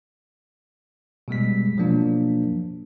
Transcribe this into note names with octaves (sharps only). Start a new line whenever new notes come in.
B2 G3 G#3 B6
B2 F3 F#3 A#3 D4